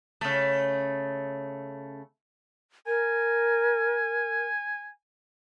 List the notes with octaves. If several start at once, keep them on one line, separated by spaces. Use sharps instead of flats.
C#3 A3
A#4 G#5